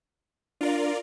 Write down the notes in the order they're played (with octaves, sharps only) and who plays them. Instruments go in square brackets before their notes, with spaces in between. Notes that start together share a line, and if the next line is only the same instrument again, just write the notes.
[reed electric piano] D4 [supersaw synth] F4 A#4 D5